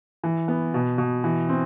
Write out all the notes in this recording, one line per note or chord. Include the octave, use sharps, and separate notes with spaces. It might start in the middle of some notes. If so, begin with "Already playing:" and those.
E3
B3
B2
B2
E3
C4